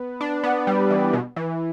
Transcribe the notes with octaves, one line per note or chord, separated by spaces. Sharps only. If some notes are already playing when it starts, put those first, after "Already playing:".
Already playing: B3
D4
B3
G3
E3
B2
E3